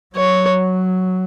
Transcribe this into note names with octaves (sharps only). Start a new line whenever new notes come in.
F#3 C#5